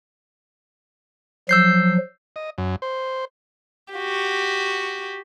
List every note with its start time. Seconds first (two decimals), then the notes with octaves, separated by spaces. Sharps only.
1.49 F3 F#3 E6 G6 C7
2.36 D#5
2.58 F#2
2.82 C5
3.93 F#4 G4